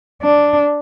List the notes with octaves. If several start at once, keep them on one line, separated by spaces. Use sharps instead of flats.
D4